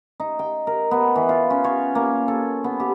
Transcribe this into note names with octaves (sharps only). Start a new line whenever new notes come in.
D#4
G5
A#4
B3
E3
F4
C#4
C#5
A#3
A4
B3
G4